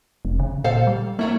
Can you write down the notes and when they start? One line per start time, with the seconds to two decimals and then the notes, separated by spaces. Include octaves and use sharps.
0.25 F1
0.40 C#3
0.64 A#2 A4 C5 F5
0.87 G3
1.19 F#3 A3 A#3 E4